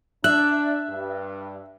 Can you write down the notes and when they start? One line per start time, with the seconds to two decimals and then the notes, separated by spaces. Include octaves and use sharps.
0.24 D4 E5 F#6
0.89 G2